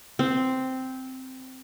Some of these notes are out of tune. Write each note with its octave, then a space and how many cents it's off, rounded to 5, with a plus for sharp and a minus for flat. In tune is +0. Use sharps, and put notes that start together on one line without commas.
C4 -5